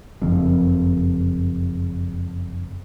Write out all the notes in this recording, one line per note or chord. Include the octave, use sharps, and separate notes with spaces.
F#1 F2